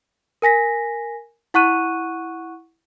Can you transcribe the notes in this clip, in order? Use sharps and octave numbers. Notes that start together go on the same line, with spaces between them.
A#4 G#5 A#6 B6
E4 F#5 C#6 F#6 D#7